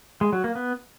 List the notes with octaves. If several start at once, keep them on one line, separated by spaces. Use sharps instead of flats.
G#3
F#3
A#3
B3